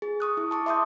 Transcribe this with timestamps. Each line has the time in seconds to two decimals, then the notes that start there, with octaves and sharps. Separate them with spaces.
0.02 G#4
0.20 C#6 D#6 F#6
0.37 E4
0.51 A5 C#6 D6
0.66 E5 C6 D6 D#6 G6